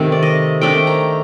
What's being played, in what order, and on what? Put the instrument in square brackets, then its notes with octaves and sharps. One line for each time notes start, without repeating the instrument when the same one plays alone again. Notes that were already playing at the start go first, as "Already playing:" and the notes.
Already playing: [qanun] C3 D#3 A3 C4
D5
D#5
D#3 A3 D4 G5
A#5